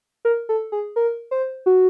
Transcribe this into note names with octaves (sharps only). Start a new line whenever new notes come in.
A#4
A4
G#4
A#4
C5
F#4